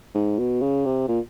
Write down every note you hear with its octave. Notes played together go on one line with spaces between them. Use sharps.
G#2
B2
C#3
C3
A#2